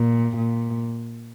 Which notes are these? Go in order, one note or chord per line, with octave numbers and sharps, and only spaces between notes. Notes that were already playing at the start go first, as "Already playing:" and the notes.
Already playing: A#2
A#2